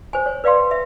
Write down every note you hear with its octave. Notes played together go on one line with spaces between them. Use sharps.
C5 G#5
C#5
B4 D5 F5 G5 C6
E5